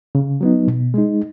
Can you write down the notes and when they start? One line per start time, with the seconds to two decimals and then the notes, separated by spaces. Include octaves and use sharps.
0.15 C#3
0.41 F#3 B3 D#4
0.68 B2
0.94 G#3 D#4